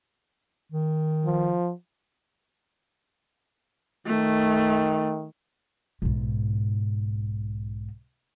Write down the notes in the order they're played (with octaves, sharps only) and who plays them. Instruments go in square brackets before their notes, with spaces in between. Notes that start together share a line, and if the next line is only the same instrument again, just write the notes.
[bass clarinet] D#3
[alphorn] F3
[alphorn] D#3 [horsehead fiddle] A3
[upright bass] B1 G#2